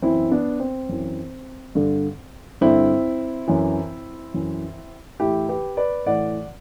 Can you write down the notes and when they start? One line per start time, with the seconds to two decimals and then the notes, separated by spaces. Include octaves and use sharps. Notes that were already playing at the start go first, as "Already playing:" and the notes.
0.02 F#2 E3 C4 E4
0.31 B3 D4
0.60 C4
0.89 F#2 E3
1.75 G2 D3
2.61 G2 D3 C4 E4
3.48 F#2 E3
4.34 F#2 E3
5.20 A2 E3 E4 G4
5.49 G4 B4
5.77 B4 D5
6.06 A2 E3 D5 F#5